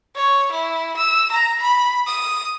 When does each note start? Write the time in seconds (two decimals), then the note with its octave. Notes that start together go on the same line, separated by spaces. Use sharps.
0.16 C#5
0.51 E4
0.96 E6
1.31 A#5
1.62 B5
2.07 D#6